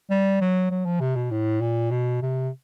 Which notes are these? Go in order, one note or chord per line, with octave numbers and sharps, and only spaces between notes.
G3
F#3
F#3
F3
C3
B2
A2
A#2
B2
C3